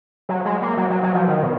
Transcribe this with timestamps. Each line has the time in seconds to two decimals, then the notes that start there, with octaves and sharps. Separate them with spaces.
0.29 F#3
0.45 G#3
0.62 A#3
0.77 F#3
0.90 F#3
1.03 F#3
1.14 F3
1.28 D#3
1.43 B2